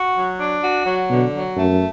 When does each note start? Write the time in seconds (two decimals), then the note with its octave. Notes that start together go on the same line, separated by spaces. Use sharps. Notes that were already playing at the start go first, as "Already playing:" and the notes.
Already playing: F#4
0.17 F#3
0.40 D4
0.63 F#4
0.86 F#3
1.10 B2 D3
1.33 F#3
1.56 F#2 A3